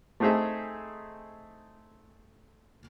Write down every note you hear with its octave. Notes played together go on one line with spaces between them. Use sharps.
A3 C4 D#4 G#4 E5